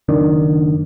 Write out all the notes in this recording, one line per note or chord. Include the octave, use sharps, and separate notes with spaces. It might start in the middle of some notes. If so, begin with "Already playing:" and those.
F#1 D#3 D4